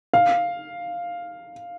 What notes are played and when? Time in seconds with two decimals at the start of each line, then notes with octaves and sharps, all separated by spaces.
0.14 F5